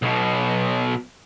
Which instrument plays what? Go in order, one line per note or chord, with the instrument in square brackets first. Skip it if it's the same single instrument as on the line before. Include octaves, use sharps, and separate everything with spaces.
[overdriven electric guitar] B1 B2